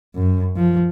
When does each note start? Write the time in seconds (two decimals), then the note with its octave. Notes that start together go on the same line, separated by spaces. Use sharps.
0.15 F#2
0.56 F3